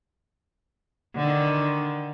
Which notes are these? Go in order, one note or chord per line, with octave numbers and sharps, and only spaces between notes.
D3 D#3